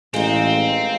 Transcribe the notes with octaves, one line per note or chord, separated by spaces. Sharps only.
A1 G#3 C4 D#4 F5